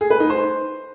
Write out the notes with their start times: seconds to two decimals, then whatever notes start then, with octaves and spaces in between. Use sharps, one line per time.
0.01 G#4
0.10 B4
0.20 D#4
0.30 C5